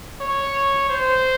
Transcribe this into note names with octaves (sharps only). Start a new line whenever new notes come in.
C#5
C5